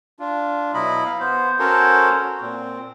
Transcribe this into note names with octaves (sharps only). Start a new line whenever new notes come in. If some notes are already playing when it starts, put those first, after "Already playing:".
D4 F4
B2 F#3 E4 D#5 B5
F5
B3 C5
C#4 F#4 A4 A#4 C5 C#5
A#2 C4